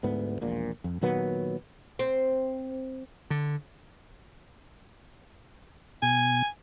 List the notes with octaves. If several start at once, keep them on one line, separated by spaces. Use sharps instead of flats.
D2 G#2 B3
E1 A#1 A#2
F2
A#2 D#3 F#3 B3
C4
D3
B2 G#5